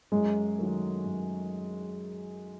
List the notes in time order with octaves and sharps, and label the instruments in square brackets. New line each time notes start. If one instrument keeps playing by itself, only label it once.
[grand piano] F#2 [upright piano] G#3
[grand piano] D#3 F#3 A3
F#2